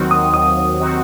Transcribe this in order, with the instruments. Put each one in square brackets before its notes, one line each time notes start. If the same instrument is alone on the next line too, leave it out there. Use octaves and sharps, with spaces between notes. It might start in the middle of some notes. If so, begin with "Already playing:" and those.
Already playing: [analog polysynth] D#2 D#3 F#3 C4 F#4
[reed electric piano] D#6
[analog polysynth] D#2 [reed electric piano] D#6
[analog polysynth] D#3 F#3 C4 F#4